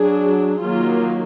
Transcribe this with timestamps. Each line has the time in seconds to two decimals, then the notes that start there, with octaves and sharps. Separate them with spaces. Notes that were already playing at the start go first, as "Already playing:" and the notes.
Already playing: F#3 D4 G#4
0.62 D#3 F#3 A#3 F4